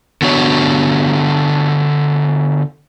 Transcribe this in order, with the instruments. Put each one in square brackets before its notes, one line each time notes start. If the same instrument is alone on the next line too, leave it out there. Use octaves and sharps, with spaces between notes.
[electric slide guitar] D3 B3 F#4 C#5